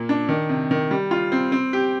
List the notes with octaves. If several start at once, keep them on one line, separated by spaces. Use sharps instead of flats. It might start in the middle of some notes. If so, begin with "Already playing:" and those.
Already playing: A#2 A#3
D4
D#3
C3
D#3
G3
F4
C4
C4
G4